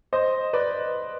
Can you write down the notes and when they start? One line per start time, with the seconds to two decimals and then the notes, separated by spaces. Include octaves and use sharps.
0.13 C5 D#5
0.53 B4 D5